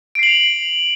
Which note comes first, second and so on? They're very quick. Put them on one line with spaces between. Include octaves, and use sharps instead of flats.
D7 C7 F#7 F7